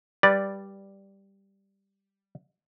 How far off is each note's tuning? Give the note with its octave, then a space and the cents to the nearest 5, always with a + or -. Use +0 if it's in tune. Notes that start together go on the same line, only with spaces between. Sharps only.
G3 +0 B4 -15 D5 +0